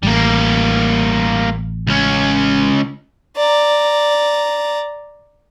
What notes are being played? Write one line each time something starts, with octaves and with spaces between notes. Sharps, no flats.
A1 G3 A#3
C#2 C#4
D5 A#5